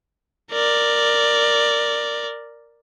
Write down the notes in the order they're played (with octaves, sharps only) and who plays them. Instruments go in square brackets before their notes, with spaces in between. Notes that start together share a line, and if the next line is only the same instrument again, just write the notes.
[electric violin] A#4 D5